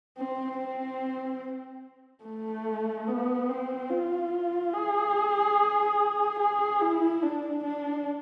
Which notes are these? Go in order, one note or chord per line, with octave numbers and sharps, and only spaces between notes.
C4
C4
A3
B3
C4
F4
G#4
G#4
E4
D4
D4